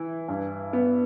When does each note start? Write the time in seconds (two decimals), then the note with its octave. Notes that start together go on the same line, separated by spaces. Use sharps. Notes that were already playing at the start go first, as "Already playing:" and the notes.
Already playing: E3 E4
0.28 G2
0.73 B3